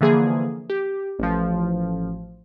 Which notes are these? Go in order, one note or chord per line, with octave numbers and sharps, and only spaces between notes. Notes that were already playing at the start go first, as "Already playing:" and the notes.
D3 E3 F3 A#3 G#4
G4
A1 F3